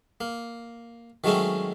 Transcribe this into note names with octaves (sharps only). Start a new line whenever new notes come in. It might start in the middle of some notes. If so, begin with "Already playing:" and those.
A#3
D#3 F#3 G#3 A3 C4 C#4